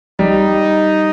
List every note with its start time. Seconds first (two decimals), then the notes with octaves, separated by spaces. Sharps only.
0.19 G3 D#4